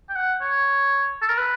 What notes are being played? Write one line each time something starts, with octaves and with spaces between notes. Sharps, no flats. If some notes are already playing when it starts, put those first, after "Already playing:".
G5
F#5
C#5
A4
A#4
B4